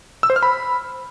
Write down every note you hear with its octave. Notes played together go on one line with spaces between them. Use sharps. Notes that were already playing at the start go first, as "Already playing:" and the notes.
E6
C5
F6
B5